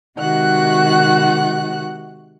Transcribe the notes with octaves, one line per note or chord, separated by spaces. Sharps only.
C3 D#3 G#3 F#4 F#5 F#6